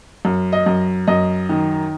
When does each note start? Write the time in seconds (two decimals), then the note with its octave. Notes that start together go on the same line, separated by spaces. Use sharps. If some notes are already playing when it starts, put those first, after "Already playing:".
0.25 F#2
0.53 D#5
0.66 F#2
1.07 F#2 D#5
1.49 D#3